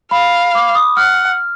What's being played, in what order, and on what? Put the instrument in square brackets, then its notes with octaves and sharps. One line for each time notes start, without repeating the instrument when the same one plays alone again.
[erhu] F5 [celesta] B5
[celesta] D6
D#6
[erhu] F#5 [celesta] F6